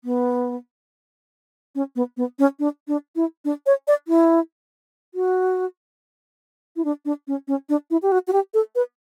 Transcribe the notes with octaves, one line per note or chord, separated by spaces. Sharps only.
B3
C#4
B3
B3
C#4
D4
D4
E4
D4
C#5
D5
E4
F#4
E4
D4
D4
C#4
C#4
D4
E4
G4
F#4
F#4
G4
A4
B4